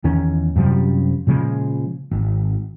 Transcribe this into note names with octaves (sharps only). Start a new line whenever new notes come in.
E2 D#3 C#4
F#2 C3 F3 G3
A#2 C#3 F3 G#3
G#1